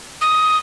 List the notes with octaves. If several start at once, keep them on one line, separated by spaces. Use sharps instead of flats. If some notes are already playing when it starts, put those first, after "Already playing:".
D#6